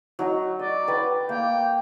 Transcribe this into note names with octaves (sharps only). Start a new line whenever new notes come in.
F#3 D#4
D5 D#5
B4 G5
A#3 G5